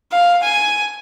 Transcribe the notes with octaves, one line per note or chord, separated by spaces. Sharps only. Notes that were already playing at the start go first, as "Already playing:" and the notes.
F5
G#5